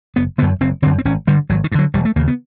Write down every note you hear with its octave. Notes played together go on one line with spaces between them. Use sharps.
F#1 B3
F#2 D3 B3
F#1 C4
F#2 D3 C4
C4
G#1 C#4
G2 D3 G3
G#1 F#3
D#3
G2
D3 F#3
E1 G3
A3
D#2 C#3 A#3
B3